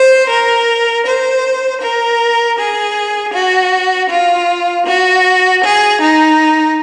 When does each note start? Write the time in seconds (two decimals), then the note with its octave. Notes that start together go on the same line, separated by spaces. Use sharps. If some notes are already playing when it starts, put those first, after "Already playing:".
Already playing: C5
0.29 A#4
1.05 C5
1.82 A#4
2.57 G#4
3.33 F#4
4.10 F4
4.86 F#4
5.62 G#4
6.00 D#4